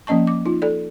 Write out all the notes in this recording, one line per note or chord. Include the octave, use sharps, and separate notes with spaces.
F3 A#3 C#4 D#5 A5 C#6
D6
D#4 F4
A4 D5